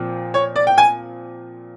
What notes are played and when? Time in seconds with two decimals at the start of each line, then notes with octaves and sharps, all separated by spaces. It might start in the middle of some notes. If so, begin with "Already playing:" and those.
Already playing: A#2 F3 C4
0.34 C#5
0.56 D5
0.67 G5
0.78 G#5